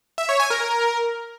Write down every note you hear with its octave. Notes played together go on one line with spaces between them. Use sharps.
E5
C#5
G#5
A#4